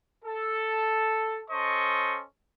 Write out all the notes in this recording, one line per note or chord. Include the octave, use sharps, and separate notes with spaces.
A4
C#4 A4 C5 D#5 C#6